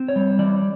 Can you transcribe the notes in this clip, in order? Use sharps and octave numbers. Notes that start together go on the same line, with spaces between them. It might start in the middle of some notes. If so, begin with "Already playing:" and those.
Already playing: C4
C#5
G3
E3 D5